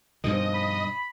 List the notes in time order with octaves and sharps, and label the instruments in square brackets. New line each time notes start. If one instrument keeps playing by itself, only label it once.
[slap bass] G2 B2 D#3 [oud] F3 C4 D4 [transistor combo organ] D#5
[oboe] B5